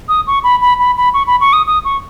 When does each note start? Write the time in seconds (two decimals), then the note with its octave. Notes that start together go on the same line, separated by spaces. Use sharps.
0.09 D#6
0.27 C#6
0.44 B5
0.62 B5
0.79 B5
0.97 B5
1.14 C#6
1.27 B5
1.41 C#6
1.53 D#6
1.67 D#6
1.85 C#6